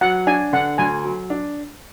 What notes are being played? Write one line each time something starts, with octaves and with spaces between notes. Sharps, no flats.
F#3 F#5
D4 G#5
D3 F#5
D2 G#5
F#3
D4